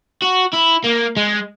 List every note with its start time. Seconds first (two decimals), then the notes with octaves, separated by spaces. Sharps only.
0.22 F#4
0.53 E4
0.84 A#3
1.17 G#3